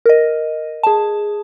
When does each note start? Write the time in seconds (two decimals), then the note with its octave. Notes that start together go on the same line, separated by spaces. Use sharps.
0.06 A#4 D#5
0.83 G#4 A5